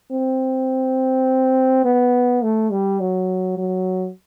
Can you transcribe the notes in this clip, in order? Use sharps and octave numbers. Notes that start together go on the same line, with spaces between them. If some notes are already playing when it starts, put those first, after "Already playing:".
C4
B3
A3
G3
F#3
F#3